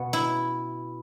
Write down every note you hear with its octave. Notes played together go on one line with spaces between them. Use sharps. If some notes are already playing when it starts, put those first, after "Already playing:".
Already playing: B2 B3
E4